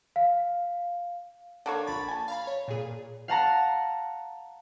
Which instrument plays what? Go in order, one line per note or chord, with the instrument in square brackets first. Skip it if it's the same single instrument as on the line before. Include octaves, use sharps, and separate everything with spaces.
[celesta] F5
[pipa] D3 A#3 C#5
[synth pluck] A#1 B5 A6
[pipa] G#5 A5
[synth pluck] F5 A#5 B5
C#5
A#2 G#4
[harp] F5 F#5 A5 A#5